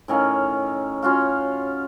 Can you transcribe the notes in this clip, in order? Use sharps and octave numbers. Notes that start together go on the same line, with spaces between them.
A2 D#3 C#4 F5
C#4 F4 F#4 F5